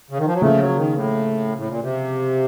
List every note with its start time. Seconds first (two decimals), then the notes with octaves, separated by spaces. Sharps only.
0.11 C#3
0.18 D#3
0.26 F3
0.34 F#3
0.42 C#3 F3 A3 A#3
0.59 F#3
0.76 D#3
0.94 A2
1.57 A2
1.69 A#2
1.81 C3